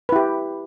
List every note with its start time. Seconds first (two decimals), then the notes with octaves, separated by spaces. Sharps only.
0.09 B4
0.12 E4
0.16 G4